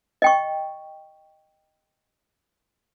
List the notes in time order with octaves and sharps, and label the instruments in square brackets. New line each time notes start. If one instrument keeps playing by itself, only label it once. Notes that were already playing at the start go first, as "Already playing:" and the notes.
[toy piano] D#5 G5 C#6